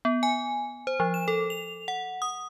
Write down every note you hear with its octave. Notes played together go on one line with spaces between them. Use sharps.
B3
G#5
C5
F3
E7
A4
F7
F#5
D#6